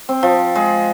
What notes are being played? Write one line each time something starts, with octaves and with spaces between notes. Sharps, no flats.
C4
F3
G#3